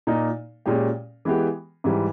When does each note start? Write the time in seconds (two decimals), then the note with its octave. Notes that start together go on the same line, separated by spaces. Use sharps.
0.07 A#2 A#3 D#4
0.66 A#2 G#3 C#4 G4
1.25 E3 G#3 B3 G4
1.84 G#2 E3 G3